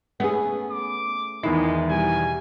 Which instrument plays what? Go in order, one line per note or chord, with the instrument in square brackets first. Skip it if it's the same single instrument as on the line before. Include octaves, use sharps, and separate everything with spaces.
[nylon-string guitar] A3 C#4 G#4 [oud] B3
[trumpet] D6
[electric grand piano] E2 D#3 C7 [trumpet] G#3 [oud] E4
[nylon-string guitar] B2 G3 [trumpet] G#5